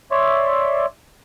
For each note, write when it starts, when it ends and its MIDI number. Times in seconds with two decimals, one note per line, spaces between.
0.11 0.86 73
0.11 0.86 74
0.11 0.86 76
0.11 0.86 84